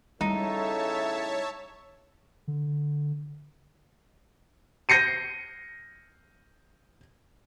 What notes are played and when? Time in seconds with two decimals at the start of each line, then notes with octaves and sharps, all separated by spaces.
0.21 A2 C#3 G3 D#4 A4 C#5 E5 A5
2.48 D3
4.89 G6 A#6 C7 C#7 D#7